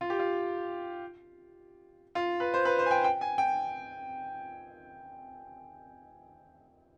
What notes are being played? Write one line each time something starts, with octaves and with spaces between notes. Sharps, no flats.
F4
G4
F4
F4
B4
C5
B4
C5
G#5
G5
G5
G#5
G5